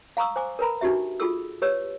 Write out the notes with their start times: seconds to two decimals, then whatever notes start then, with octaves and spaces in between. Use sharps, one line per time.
0.17 F5 A#5 C#6 D#6 E6
0.36 C5 G#5 D6
0.59 A#4 B4 A#5 B5
0.81 D4 D#4 F#4 G4 E5
1.20 F4 G#4 A4 E6
1.62 G4 B4 C#5 E6